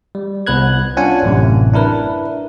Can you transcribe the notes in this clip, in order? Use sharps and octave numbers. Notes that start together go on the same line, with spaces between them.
G3
C2 B3 B4 F#6 G#6
C#4 D4 F4 F#5 G#5
A1 F#2 A2 C3
D4 E4 A#4 B4